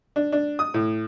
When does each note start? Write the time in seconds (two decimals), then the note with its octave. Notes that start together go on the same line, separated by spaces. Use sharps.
0.16 D4
0.32 D4
0.59 D#6
0.74 A2